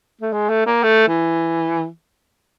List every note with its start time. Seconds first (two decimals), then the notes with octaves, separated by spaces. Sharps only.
0.21 A3
0.33 G#3
0.49 A3
0.66 A#3
0.83 A3
1.08 E3